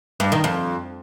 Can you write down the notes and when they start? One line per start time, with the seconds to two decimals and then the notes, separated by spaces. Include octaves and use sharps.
0.20 G2
0.32 D#3
0.44 F2